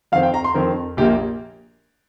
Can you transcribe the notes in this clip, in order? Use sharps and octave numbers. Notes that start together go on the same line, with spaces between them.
F2 D#3 C4 F5
G5
A#5
C6
F2 D#3 C4 A#4
A#1 A#2 A#3 G4